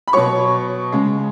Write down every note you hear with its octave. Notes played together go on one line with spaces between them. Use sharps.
B5
B2 F#3 C#5 C#6
C#3 G#3